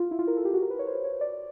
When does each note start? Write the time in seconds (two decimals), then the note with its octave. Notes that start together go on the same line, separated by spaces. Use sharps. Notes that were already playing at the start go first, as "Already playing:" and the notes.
Already playing: F4
0.11 E4
0.19 F4
0.27 A#4
0.37 A4
0.45 G4
0.54 F#4
0.62 A#4
0.70 B4
0.79 C#5
0.87 C5
1.04 C#5
1.21 D5